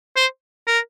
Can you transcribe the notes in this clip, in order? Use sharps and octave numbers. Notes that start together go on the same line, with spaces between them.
C5
A#4